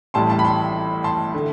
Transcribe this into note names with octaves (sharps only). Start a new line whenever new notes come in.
A1 A2 G3 A5 C6
A5 C6
B5
A5 C6
A5 C6
D3 A3